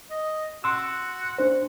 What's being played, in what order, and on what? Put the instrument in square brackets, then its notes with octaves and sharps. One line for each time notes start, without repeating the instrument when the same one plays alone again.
[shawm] D#5
[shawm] F#4 [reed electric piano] C6 E6
[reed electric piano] D4 C5